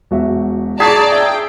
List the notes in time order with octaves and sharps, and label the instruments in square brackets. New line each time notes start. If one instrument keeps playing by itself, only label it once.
[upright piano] E1 F#4 E5
[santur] G#4 [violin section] D5 A5 A#5 [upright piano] C#6 G#6 B6
[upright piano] E5 E6 [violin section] G5